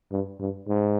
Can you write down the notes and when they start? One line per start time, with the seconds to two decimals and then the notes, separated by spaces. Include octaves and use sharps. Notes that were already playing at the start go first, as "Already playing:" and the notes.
0.12 G2
0.40 G2
0.68 G#2